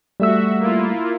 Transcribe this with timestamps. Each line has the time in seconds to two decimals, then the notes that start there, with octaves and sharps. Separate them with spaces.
0.20 G3 A3 F#4 E5 E6
0.60 A#3 E4 F4